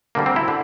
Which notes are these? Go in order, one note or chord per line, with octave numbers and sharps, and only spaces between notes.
D2 D3 G3 A#3
C4
E4
D3